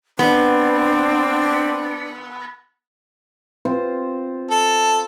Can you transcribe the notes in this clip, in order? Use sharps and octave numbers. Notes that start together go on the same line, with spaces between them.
B3 C4 D4
C4 F4 C5
A4